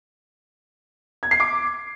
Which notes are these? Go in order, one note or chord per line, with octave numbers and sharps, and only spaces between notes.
G#6
C7
D6